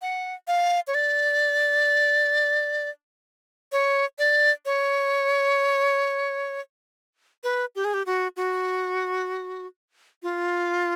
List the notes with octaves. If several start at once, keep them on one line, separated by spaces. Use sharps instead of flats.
F#5
F5
C#5
D5
C#5
D5
C#5
B4
G4
G#4
G4
F#4
F#4
F4